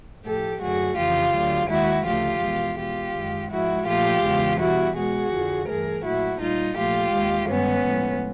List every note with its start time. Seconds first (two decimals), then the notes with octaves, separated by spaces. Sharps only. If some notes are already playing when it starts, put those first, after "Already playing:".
0.25 A2 F3 A3 G4 A4
0.61 F#2 D3 F#3 A3 F#4 G#4
0.97 F2 C#3 E3 F4 G4
1.33 D2 D3 F#3
1.69 D#2 D#3 G#3 E4 F#4
2.05 D2 C#3 F3 A3 F4 G4
2.42 E2 B2 G#3
2.78 B2 G#3 F4 G4
3.14 F#2 D#3 G#3
3.50 G#2 F3 G#3 E4 F#4
3.86 A#2 F3 A3 F4 G4
4.22 E2 C#3 E3 G#3
4.59 B2 G3 E4 F#4
4.95 B2 G#3 F#4 G#4
5.31 F2 D3 F3
5.67 G2 E3 A3 G#4 A#4
6.04 A#2 F#3 A3 E4 F#4
6.40 A#2 G3 D#4 F4
6.76 A#2 F3 A3 F4 G4
7.12 D#2 D#3 G#3
7.48 G2 D#3 G#3 B3 C#4
7.85 A2 F3 G#3